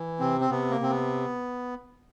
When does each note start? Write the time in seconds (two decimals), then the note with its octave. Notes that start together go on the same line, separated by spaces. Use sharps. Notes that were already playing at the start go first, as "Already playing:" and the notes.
Already playing: E3
0.20 C3 C4
0.41 C4
0.51 C3 B3
0.71 A#3
0.81 C3 C4
0.90 B3